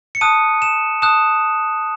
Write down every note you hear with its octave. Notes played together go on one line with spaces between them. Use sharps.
C#7
A5 D#6 F#6 D#7
E7
A5 D#6 F#6 E7